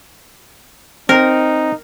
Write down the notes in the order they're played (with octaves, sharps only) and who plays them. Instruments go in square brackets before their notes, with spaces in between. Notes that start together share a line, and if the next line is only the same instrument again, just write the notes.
[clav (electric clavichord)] C4 [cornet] D#4 [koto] A#4